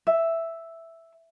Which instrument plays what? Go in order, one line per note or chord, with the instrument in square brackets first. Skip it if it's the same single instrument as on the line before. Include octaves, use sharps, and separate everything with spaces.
[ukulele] E5